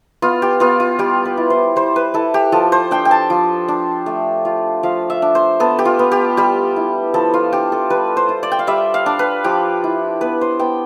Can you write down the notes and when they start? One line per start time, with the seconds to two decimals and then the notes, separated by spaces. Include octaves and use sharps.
0.22 B3 F4
0.42 G4
0.60 B3 F4
0.80 F4
0.99 G3 G4
1.25 B4
1.37 E4
1.50 C5
1.76 G3 C5
1.96 B4
2.14 E4 A4
2.34 G4
2.52 F3 A4
2.72 C5
2.91 D4 G5
3.05 G5
3.11 A5
3.30 F3
3.68 D4
4.06 A3
4.45 F4
4.83 F3 F5
5.10 E5
5.22 D4
5.35 C5
5.60 B3 A4
5.79 G4
5.85 F4
5.99 B3
6.12 G4
6.37 G3 G4
6.76 E4
7.14 F3 A4
7.34 F4
7.53 D4 G4
7.72 A4
7.90 G3 B4
8.17 C5
8.29 F4
8.43 D5
8.52 G5
8.59 F5
8.67 G3 E5
8.94 F5
9.06 D4
9.19 B4
9.44 F3 G4
9.84 E4
10.21 B3 B4
10.41 C5
10.59 B3 G5